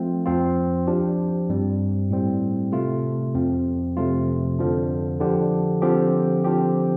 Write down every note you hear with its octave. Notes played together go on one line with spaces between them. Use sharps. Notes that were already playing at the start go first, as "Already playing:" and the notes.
Already playing: F3 A3 C4 F4
F2 F3 C4 F4
F3 D4 G4
G2 G3 C4
A2 G3 C4
C3 A3 F4
F2 F3 C4
F2 C3 F3 A3 F4
F2 D3 F3 D4
D3 F3 D4 G4
D3 F3 C4 G4
D3 F3 C4 G4